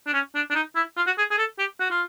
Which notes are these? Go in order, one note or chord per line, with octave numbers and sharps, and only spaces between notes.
D4
C#4
D4
D4
D#4
E4
F4
F#4
G#4
G#4
A4
G4
F#4
F4